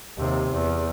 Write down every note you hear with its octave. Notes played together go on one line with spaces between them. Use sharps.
D#2 C3
E2